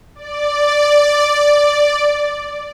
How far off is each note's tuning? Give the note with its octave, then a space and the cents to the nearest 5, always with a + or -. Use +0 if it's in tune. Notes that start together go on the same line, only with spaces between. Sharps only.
D5 +0